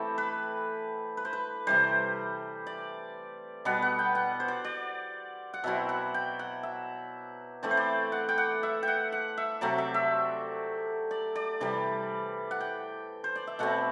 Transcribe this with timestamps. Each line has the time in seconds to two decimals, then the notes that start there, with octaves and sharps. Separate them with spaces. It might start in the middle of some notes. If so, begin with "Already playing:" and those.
Already playing: E3 A3 C4 E4 G4 A4
0.18 B4
1.17 B4
1.25 C5
1.33 B4
1.67 C3 E3 G3 C5
2.67 D5
3.65 B2 G3 B3 F#5
3.82 F#5
3.99 G5
4.15 F#5
4.40 C5
4.48 D5
4.64 D5
5.54 F#5
5.64 B2 F#3 C4 E4 E5
5.89 F#5
6.14 G5
6.39 F#5
6.63 E5
7.63 E3 A3 C4 D5
7.71 C5
7.77 D5
8.12 F#5
8.29 G5
8.38 F#5
8.63 E5
8.83 F#5 G5
9.12 F#5
9.38 E5
9.61 C3 F#3 A3 C4 D5
9.78 E5
9.94 E5
11.11 D5
11.35 D5
11.61 C3 E3 G3 D5
12.51 F#5
12.60 G5
13.24 C5
13.36 D5
13.47 E5
13.59 B2 A3 C4 F#5